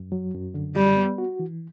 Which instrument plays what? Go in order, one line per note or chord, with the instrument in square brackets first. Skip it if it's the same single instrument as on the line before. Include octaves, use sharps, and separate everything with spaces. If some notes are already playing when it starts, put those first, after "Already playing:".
Already playing: [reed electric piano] F#2
F#3
F#2
D3
[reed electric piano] F#2 [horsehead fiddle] G3
[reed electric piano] B3
F#4
E3